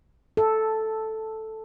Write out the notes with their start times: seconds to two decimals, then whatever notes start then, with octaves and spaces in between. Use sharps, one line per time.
0.37 A4